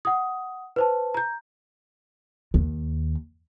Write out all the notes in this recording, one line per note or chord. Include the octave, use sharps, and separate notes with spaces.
F#5 D#6
B4 C5 A5
A#5 G6
D#2